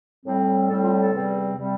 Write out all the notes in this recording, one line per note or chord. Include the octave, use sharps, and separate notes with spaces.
A2 G3 C4
A2 G3 C4 A4
F4
A4
E2 C3 G3 C4
C3 G3 C4